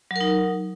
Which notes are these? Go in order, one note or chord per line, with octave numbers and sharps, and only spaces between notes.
F#3 D#4 A#4